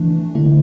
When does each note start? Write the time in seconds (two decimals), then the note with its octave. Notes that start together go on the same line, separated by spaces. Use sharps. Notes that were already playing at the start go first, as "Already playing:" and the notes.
Already playing: E3 A3 D4
0.35 D3 A3 E4